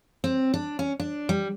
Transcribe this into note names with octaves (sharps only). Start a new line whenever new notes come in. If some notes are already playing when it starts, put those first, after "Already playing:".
C4
D4
C#4
D4
G3